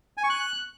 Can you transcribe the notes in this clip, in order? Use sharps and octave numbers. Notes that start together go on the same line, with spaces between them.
G#5
C#6
F#6